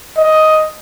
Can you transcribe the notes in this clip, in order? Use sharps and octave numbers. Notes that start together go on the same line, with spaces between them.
D#5